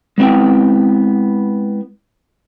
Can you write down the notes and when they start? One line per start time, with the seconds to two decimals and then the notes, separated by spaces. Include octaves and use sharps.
0.18 G#3 B3 C4 E4 G5